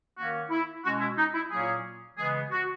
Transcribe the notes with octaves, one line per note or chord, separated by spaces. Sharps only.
D#3 A#3 C#4 F#4
E4
B2 G#3 C#4 F#4
E4
D#4
E4
A#2 F#3 A#3 C#4 G#4
C#3 E3 G#3 B3 G#4
F#4